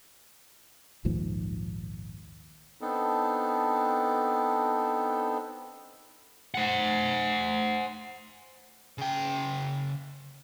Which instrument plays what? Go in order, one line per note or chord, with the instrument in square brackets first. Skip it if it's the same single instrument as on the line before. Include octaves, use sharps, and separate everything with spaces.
[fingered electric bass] A#1 D#2 G#2 F3
[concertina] B3 C4 D4 D#4 A4
[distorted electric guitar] C5 F#5
C#3 G5